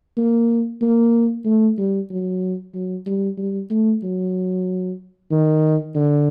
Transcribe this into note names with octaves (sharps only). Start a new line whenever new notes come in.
A#3
A#3
A3
G3
F#3
F#3
G3
G3
A3
F#3
D#3
D3